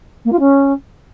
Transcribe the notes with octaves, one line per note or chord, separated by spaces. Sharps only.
A#3
F4
C#4